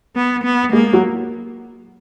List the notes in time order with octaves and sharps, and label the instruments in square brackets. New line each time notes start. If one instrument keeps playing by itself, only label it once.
[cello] B3
B3
[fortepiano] G#3 [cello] A#3
[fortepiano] F#3